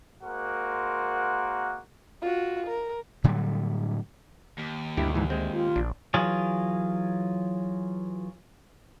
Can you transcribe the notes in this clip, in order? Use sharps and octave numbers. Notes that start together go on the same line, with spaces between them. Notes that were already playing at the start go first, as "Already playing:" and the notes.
G#3 A#3 F#4 A#4 C5 F#5
F4 F#4
A#4
A2 D3 F#3 G3
D#2
D2 G2 E4 G4
G#2 E3 G#3
G#3 C4
F4
A#1 D4
E3 F#3 F4 G#4